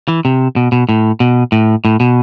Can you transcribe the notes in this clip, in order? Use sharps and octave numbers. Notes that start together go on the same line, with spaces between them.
E3
C3
B2
B2
A2
B2
A2
A2
B2